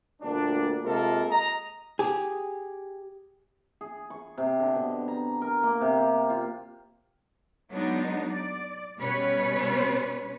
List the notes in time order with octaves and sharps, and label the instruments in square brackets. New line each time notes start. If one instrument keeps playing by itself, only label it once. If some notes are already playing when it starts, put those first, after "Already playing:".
[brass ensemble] D2 A#2 G3 D4
C3 G#3 A#3 F4 A4 A#4
D#5 A#5
[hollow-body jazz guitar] G4 G#4
[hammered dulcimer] G#4
C#6
C3
D3
B2
A#5
A#4
A#3
C3
G4
F4
[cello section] F#3 G#3 B3 D4 D#4
D5
B2 G3 C#4 B4 C#5